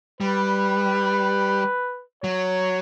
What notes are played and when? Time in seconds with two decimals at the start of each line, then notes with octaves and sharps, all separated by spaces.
0.20 G3 B4
2.23 F#3 C#5